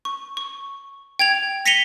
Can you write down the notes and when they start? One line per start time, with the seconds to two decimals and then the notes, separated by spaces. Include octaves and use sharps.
0.05 C#6
0.37 C#6
1.19 G5 G#6 F7
1.66 A#6 B6 C#7 D#7 F7 G7